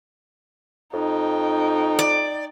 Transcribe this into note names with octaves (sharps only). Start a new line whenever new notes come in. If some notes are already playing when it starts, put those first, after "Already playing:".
F2 D#4 G5
D5